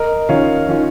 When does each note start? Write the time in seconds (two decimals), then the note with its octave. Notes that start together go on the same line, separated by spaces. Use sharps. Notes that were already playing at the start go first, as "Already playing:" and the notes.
Already playing: A#4 D#5
0.29 D#3 C#4 F4 C#5 F5
0.68 D#3 C#4 F4